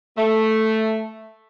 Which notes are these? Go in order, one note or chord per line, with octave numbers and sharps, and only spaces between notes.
A3